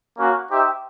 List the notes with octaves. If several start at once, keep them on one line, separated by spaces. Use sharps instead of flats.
A#3 C#4 F#4
D#4 G4 C5 E5 G5